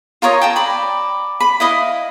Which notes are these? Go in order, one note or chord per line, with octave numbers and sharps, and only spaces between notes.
F4 A#4 C#5 D#5
G5 A5 A#5
D5 B5
B5
E4 D#5 F5